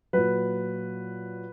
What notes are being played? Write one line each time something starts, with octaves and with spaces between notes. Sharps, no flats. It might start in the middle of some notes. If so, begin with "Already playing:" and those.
A#2 F#3 B4